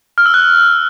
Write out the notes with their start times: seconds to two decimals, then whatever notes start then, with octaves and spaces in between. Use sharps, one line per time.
0.18 F6
0.26 E6
0.34 F#6